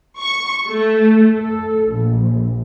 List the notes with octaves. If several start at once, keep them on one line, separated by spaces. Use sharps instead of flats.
C#6
A3
A4
A#1